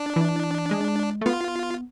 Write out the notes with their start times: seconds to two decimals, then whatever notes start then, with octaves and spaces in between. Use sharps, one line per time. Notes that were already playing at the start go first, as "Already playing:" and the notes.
Already playing: D4
0.16 E3
0.71 G#3
1.21 A3
1.26 B3 F4